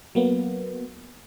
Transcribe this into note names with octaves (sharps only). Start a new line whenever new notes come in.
F#3 A#3 B3